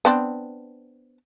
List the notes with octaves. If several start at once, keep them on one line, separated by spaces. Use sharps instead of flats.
B3 C4 D4